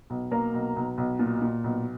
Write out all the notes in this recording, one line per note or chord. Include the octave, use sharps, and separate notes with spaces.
B1
A#3 A#5
B1
B1
B1
A#2
A#2
B1